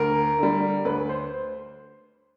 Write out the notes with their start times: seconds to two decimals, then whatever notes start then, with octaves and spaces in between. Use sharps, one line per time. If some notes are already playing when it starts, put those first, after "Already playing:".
Already playing: D2 A#4
0.39 D3 G3
0.85 D2 B4
1.09 C5